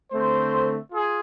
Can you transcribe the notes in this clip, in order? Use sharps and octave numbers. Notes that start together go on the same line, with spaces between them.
D3 A3 C4 C5
F4 G#4